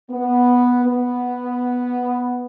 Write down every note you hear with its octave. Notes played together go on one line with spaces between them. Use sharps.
B3
B3